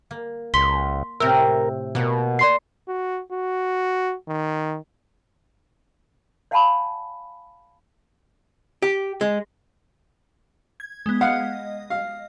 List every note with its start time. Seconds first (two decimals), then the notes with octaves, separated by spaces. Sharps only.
0.11 A#3
0.54 C#2 C6 B6 G7
1.20 A2 C3 A#4 E6
1.95 B2 A#3 F#5
2.39 D5 C6 C7
2.88 F#4
3.32 F#4
4.29 D#3
6.51 D5 F5 F#5 G#5 A5 B5
8.82 G4
9.21 G#3
10.80 G#6
11.06 G#3 B3
11.21 D#5 F5 F#5
11.90 F5